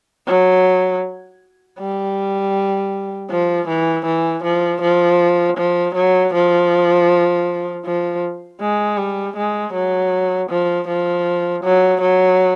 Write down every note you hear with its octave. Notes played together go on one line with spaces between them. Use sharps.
F#3
G3
F3
E3
E3
F3
F3
F3
F#3
F3
F3
G#3
G3
G#3
F#3
F3
F3
F#3
F#3